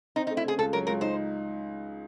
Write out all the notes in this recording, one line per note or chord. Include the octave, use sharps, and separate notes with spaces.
C4 D#4
D#4
A3
E4
C#3 G#4
C#2 A4
F#3 A#4
C#2 A#4
D#4 C5